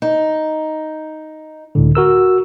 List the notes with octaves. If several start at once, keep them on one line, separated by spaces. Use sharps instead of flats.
D#4
C#2 A2 D3
F#4 A#4 E6